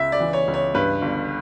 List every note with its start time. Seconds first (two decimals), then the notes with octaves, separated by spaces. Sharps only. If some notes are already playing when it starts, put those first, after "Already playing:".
Already playing: C#2 E5
0.12 D5
0.20 E3
0.33 C#5
0.48 C#2
0.54 C#5
0.74 G2 B4
1.02 G1